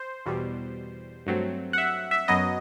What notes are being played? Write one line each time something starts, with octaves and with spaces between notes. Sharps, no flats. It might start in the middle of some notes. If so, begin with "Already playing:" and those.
Already playing: C5
E2 B2 G3
G2 F#3 A3 C4
F#5
E5
E5
F#2 F#3 B3 D#5